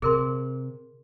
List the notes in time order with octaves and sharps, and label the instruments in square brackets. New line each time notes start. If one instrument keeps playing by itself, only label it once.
[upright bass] C3 [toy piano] G#4 A#4 C6